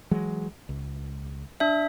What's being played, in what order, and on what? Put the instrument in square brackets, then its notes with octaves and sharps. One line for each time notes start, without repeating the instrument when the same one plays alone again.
[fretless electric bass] E3 F#3 G#3
C#2
[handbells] D4 E5